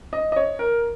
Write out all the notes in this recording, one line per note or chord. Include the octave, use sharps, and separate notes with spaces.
D#5
D#5
C#5
A#4